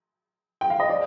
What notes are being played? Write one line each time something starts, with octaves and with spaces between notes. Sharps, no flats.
G5
F5
D#5
D5